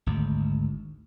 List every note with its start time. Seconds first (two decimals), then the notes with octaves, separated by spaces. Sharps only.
0.06 G#1 D2